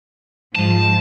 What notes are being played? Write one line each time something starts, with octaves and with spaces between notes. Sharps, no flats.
G#2 F3 A5